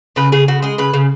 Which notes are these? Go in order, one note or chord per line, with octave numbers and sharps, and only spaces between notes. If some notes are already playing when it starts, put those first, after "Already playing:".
C#3 B4
C#3 G#4
C#3 F#4
G#3 G#4
C#3 B4
C#3